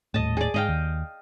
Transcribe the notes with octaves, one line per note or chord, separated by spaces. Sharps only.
D#1 A2 D#5 A5
G#4 D5
G#2 D#5 F5 G5
D#2